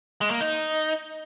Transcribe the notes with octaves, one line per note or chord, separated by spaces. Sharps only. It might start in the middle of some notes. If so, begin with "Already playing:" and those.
G#3
A#3
D#4